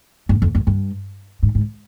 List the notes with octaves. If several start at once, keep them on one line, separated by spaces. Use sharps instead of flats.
G2
F2
F#2
G2
G#2
G#2